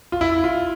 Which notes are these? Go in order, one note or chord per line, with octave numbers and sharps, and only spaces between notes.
F4
E4
F4